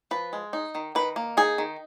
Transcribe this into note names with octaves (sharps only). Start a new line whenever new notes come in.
F3 B4
G#3
D#4
D#3
D#3 B4
A#3
D#4 G#4
D#3